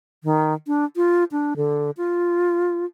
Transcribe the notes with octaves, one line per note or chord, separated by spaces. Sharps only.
D#3
D4
F4
D4
D3
F4